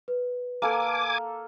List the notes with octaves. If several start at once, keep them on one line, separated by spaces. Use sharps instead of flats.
B4
A#3 A4 G#5 D6